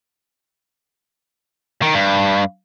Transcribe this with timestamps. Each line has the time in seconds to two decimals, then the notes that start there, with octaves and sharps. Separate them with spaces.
1.82 D#3
1.94 G2